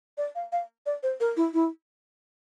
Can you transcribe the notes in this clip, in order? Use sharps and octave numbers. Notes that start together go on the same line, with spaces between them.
D5
F5
F5
D5
C5
A#4
E4
E4